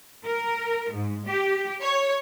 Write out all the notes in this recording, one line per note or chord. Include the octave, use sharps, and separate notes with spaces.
A#4
G#2
G4
C#5